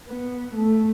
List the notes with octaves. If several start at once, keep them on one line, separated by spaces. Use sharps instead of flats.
B3
A3